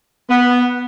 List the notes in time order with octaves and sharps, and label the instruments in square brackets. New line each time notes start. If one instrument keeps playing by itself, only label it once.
[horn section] B3